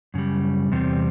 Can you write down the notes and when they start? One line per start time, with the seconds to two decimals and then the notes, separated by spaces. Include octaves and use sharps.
0.14 F#2 C#3 G3
0.72 E2 C3 G3 C4